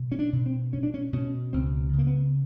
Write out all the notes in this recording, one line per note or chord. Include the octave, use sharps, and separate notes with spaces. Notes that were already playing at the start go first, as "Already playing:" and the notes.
Already playing: B2
C#4
D4
B2
C4
B2 C#4
D4
C#4
B2 C#4
C#2 C4
C#3
A#3
B3